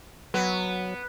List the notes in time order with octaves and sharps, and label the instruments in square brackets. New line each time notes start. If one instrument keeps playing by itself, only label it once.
[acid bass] F#3 [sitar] B3